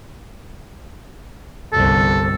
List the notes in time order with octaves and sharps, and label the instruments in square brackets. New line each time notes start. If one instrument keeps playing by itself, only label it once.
[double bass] G1 C2 [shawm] A4